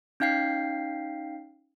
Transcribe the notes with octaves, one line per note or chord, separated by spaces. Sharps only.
C#4 D#4 F5 G5 C7